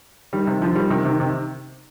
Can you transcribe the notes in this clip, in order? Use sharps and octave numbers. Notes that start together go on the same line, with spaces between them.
D#3 G3
C3 D#3
D3 F3
D#3 G3
C3 D#3
C3 D#3
C3 D#3